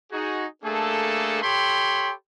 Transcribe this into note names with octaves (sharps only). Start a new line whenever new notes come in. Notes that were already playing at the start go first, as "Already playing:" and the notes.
D#4 F#4 G#4
A3 A#3 D4 G#4 A4
G4 A4 C#5 G5 B5 C6